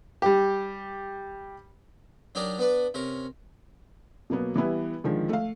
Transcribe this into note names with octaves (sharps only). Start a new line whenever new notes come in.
G3 G4
F#3 D4 D#4 G4 A#4 D5
B3 D4 B4 D5
C3 C#4 A#4
B2 F#3 A#3 B3
E3 G3 B3 E4
D3 D#3 F3 G#3
A3 F5